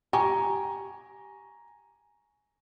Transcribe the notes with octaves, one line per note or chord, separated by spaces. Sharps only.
G4 G#5 A#5 C#6